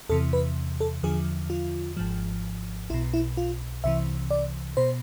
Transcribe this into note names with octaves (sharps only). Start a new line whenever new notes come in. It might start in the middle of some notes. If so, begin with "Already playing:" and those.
E2 C3 E3 A4
B4
A4
E2 D3 F3 G#4
F4
G#1 G#2 F3
B1 B2 E4
E4
F4
C2 C3 E3 E5
D5
B2 C5